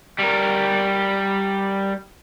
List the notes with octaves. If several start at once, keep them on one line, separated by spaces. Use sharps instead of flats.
G3 A#4